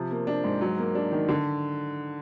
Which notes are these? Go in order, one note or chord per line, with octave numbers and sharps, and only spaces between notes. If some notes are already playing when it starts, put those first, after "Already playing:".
Already playing: C3 F3
A#3
D4
G#2
F#3
A#3
D4
D#3
D3